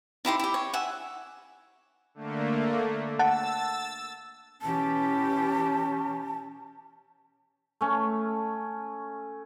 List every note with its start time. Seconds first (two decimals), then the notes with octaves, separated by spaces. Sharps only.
0.25 D#4 E4 G4 C6
0.40 E4 G4
0.54 C#5
0.74 E5 F#5 G#5
2.14 D3 A3 A#3
3.19 F#5 A5 E6 A6
4.62 B2 E3 C#4 G4 A5
7.81 A3 C#4